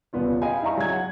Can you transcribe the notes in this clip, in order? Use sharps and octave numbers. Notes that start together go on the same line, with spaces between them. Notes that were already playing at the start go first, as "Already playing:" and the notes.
D#1 C2 B3 F4 D5
D#5 F5 G5 G#5 B5
E4 D5 F5 A#5 C#6
F#3 G#3 G#6
F#5